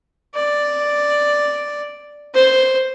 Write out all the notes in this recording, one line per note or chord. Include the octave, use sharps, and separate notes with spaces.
D5
C5